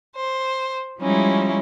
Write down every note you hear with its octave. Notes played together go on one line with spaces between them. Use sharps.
C5
F3 G3 G#3 C#4 D#4 E4